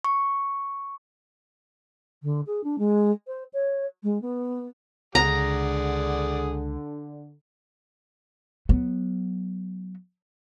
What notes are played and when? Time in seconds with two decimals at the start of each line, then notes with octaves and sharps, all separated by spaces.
0.04 C#6
2.23 D3
2.46 G#4
2.64 D4
2.78 G#3
3.27 C5
3.53 C#5
4.03 G#3
4.21 B3
5.15 C#2 D3 G#4 D5 F#5 A#5
8.69 F#3 B3